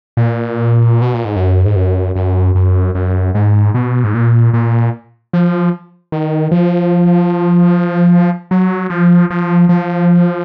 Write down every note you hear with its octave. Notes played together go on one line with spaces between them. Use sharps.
A#2
B2
A#2
G#2
F#2
G#2
F#2
F#2
F#2
F#2
G#2
B2
G#2
A#2
A#2
F3
D#3
F3
F#3
F3
F3
F3